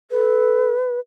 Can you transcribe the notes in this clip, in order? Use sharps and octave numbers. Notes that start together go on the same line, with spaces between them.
A4 B4